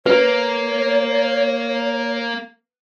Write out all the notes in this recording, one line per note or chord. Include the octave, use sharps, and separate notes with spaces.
A#3 B4 C#5